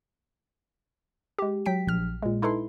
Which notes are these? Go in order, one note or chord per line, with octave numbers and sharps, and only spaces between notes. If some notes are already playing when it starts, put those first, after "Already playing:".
G#3 G4
F#3 G5 B6 D7
A#1 F6
A#2 G#3
D#4 E4 A4 B4 C6